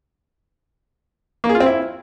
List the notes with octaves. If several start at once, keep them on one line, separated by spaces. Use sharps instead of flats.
A#3
G#4
F4
C4
E4